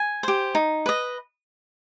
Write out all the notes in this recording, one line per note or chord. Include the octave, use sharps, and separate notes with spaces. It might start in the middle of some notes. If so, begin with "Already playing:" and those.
Already playing: G#5
G4 C5
D#4
B4 D#5